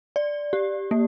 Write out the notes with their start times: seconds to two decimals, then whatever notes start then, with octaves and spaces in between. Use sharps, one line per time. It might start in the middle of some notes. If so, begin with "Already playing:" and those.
0.16 D5
0.53 G4
0.91 A#3